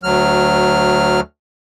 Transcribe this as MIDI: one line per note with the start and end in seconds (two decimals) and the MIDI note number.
0.03 1.20 38
0.03 1.20 54
0.03 1.20 89